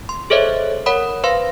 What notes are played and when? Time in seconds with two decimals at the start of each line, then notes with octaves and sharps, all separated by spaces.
0.09 C6
0.30 G#4 A4 C5 C#5 D#5 E5
0.86 A#4 C#5 F#5 B5 D#6
1.24 B4 C5 F5 C6 A#6